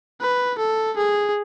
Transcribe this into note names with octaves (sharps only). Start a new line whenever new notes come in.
B4
A4
G#4